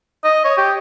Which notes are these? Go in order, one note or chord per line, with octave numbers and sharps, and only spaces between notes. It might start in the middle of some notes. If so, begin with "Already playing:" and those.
D#5
C#5
G4